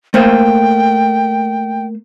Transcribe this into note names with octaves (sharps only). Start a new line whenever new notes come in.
A3 A#3 C5 G5